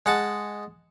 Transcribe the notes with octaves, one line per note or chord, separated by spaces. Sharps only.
G#3 F#5 A5